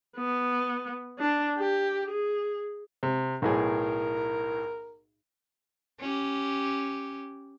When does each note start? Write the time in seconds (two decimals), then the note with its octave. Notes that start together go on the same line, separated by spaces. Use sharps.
0.16 B3
1.19 D4
1.58 G4
2.10 G#4
3.03 C3
3.42 B1 A2 G#4 A#4
6.00 C#4 G4